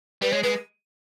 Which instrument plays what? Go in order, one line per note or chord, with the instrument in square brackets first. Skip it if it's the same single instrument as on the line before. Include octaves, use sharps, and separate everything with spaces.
[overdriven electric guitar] G3 [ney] B4
[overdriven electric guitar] G#3 [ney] C#5
[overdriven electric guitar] G#3 [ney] B4